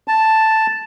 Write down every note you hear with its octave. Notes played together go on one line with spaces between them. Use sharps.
A5